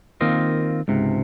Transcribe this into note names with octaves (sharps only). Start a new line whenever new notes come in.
D#3 A#3 C4 F4 D#5
C#2 G#2 C3